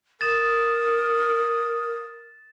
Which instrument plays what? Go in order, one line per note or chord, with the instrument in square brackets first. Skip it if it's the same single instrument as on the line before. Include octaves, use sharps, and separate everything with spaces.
[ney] A#4 [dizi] D#6 [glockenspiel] A6 E7